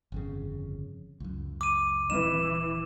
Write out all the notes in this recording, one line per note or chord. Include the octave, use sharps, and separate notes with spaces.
G1 F2 C#3
C#2 F#2
D6 D#7
D#1 E3 G3 C4 E7